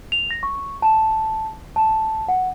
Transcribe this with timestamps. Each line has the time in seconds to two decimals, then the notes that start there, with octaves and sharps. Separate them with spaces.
0.12 F7
0.31 A#6
0.43 C#6
0.82 A5
1.76 A5
2.28 F#5